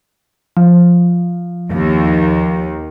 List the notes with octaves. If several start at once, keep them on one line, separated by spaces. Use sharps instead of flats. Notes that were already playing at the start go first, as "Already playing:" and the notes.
F3
D#2